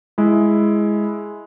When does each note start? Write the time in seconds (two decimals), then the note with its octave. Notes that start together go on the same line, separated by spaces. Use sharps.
0.18 G#3 E4